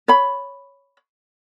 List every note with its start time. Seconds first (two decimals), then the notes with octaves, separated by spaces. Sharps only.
0.08 C#5 B5